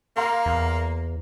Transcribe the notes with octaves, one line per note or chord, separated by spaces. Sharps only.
A#3 F5 A#5 C6
E2